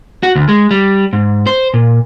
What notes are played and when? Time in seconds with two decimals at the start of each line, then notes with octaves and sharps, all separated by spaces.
0.23 F#4
0.35 D2
0.49 G#3
0.71 G3
1.13 G#2
1.47 C5
1.74 A#2